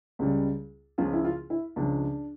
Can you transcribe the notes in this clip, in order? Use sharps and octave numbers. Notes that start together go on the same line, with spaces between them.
C#2 C#3 G3
C#2 C#3 F3 F4
E4
F4
E4
C#2 C#3 F3 D4